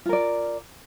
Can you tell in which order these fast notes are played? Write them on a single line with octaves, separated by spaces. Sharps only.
F4 A#4 D5